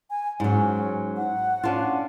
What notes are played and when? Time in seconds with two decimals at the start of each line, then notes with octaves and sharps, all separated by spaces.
0.10 G#5
0.40 G#2 F#3 C#4
1.17 F#5
1.63 C#4 D4 F4